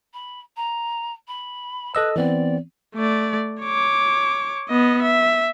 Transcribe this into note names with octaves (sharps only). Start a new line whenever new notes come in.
B5
A#5
B5
A4 B4 D#5 E6
E3 B3 C4 D5
A3 D5
C#5 D6
B3 D#5
E5